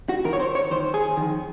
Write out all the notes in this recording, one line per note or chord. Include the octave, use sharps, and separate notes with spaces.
F#4
D#2 D#3 A#4
C#5
C5
C#5
D#2 D#3 C5
G#4
F2 D#3